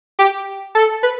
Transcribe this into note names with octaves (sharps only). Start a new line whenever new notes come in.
G4
A4
B4